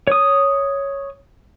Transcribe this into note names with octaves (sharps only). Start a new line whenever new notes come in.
C#5 D#6